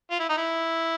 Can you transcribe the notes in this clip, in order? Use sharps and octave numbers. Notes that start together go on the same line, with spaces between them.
F4
E4
D#4
E4